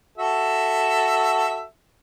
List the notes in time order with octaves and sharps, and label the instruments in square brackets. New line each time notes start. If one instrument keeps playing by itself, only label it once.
[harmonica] F#4 A4 E5